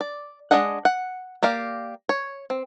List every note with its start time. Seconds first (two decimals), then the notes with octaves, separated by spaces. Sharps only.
0.01 D5
0.51 G#3 D4 G#4 D#5 F#5
0.85 F#5
1.43 A#3 G4 D5 F5
2.09 C#5
2.50 C4